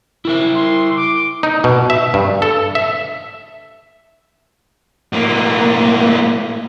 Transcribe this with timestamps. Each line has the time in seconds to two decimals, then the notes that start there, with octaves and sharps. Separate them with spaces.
0.25 E4 A#4 E5
0.55 C6
0.96 D6
1.43 D#4
1.64 B2
1.90 E5
2.14 G2
2.42 A4
2.75 E5
5.13 A2 A#3